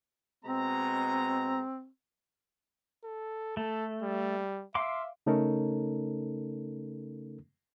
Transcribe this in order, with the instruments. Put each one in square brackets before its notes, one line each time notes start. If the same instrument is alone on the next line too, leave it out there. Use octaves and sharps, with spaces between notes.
[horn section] B2 G#3 A#5 [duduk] C4
[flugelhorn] A4
[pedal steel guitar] A3 [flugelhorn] A4
[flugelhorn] G3
[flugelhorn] E5 [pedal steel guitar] F5 C6 D6
[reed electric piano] C#3 A3 C#4 D#4 A4 A#4